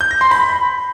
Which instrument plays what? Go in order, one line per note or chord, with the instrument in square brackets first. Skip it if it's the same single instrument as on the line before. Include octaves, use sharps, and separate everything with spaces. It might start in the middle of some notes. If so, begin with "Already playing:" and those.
[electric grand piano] G6
A#6
C6
B5